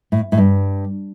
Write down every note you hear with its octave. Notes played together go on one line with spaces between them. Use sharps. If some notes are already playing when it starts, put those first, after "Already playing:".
A2
A2
G2